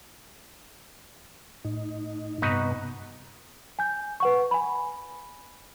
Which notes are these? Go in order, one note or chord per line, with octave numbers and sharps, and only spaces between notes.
A2 D#4
G2 C3 B3 D#4 F#4 B4
G#5 G6
B4 F#5 C#6
G#5 B5